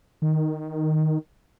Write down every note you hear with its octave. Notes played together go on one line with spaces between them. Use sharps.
D#3